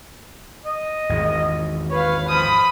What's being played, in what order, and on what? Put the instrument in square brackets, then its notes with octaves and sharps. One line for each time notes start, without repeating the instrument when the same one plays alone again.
[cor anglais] D#5
[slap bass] G#1 E2
[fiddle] B4 F5 [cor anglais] C#5
[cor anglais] F3 [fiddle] B5 D#6